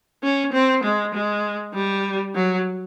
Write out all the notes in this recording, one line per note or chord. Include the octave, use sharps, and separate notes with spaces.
C#4
C4
G#3
G#3
G3
F#3